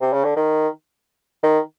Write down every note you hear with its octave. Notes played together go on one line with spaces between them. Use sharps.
C3
C#3
D3
D#3
D#3